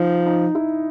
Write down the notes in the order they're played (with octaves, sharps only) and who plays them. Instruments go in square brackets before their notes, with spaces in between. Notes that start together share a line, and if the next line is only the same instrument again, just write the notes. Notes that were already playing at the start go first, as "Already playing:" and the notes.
Already playing: [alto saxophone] F3 [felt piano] D#4
[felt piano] D#4
E4